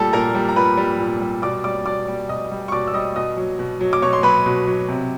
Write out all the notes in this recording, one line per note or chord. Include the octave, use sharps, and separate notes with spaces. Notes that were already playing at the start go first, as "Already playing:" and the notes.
Already playing: A#2 G3 A4 A5
A#2 A#4 A#5
G3
A#5
A#2 B4 B5
G3
A#2
G3
B2 D5 D6
G3 D5 D6
B2 D5 D6
G3
B2 D#5 D#6
G3
C#6
B2 D5 D6
E6
G3 D#5 D#6
B2 D#5 D#6
F#3
B2
F#3
D6
B2 C#5 C#6
C6
F#3 B4 B5
B2
F#3
C3